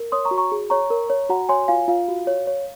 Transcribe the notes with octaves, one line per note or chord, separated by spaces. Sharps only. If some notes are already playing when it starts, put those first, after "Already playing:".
Already playing: A#4
C#5 C6 D#6
A#5 C#6
F#4
A#5 C#6
G#4
C#5 A#5 C#6
A#4
C#5
F#4 F#5 A#5
C#5 G#5 C6
F4 F5 G#5
F4 F5
F#4
C#5
C#5